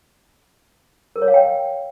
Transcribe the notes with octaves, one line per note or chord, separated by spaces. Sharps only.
A#4
C#5
F5
G5